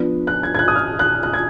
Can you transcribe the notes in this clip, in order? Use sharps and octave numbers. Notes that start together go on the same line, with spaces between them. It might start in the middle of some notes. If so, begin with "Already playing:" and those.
Already playing: F3 B3 D4
F#6
G#6
G#6
F#6
D#6
F6
F#6
F#6
G#6